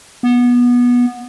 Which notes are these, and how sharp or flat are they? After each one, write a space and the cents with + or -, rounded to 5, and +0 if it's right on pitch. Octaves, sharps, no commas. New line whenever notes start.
B3 -20